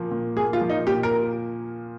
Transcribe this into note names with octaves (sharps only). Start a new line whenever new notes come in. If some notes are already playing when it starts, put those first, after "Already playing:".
Already playing: A#2 F3 A#3
A#2
A#3 G#4
F4
F3
D#4
A#2 G4
A#4